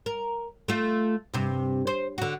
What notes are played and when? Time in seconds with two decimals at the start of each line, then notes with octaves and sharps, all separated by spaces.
0.06 A#4
0.68 A3 F4
1.34 G2 C3
1.87 C5
2.18 D3 F#4